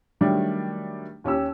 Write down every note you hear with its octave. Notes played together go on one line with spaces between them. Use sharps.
D#3 F#3 G3 A3 D4
D#2 C#4 G4 E6